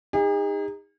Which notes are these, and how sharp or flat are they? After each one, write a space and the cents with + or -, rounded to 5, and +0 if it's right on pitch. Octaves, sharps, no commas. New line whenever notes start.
D#4 +0 G#4 -45